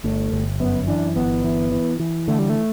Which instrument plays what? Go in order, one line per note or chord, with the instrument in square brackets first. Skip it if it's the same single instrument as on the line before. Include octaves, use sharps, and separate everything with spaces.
[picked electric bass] G1 [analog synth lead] A3
[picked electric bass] G1
[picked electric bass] F#2 [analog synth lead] B3
[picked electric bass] E3 [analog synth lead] D4
[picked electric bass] G1 [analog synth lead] B3
[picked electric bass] E3
E3
E3
[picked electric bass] D3 [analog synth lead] A3
[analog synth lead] G3
A3